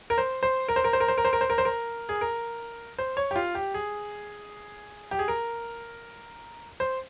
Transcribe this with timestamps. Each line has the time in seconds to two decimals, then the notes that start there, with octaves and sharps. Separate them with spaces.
0.10 A#4
0.18 C5
0.43 C5
0.68 A#4
0.76 C5
0.84 A#4
0.93 C5
1.00 A#4
1.08 C5
1.18 A#4
1.25 C5
1.33 A#4
1.41 C5
1.50 A#4
1.58 C5
1.65 A#4
2.09 G#4
2.21 A#4
2.98 C5
3.17 C#5
3.31 G4
3.36 F4
3.55 G4
3.74 G#4
5.11 G4
5.19 G#4
5.28 A#4
6.80 C5